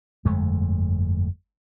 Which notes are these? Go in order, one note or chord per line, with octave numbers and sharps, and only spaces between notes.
G1 F2 G#3 A3